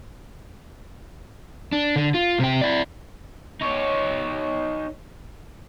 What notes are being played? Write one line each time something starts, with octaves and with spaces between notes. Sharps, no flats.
D4
D3
F4
C3 G5
E4 D5
D#4 C#5